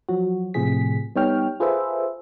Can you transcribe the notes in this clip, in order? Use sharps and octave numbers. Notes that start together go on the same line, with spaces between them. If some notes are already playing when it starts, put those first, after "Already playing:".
F3 F#3 F#4
A2 C3 F3 A3 G#4 B6
G3 B3 D#4 C#5 G5 F6
F4 G#4 A4 B4 C5 E5